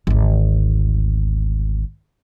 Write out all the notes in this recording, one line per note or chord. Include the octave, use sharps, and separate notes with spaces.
G#1 D2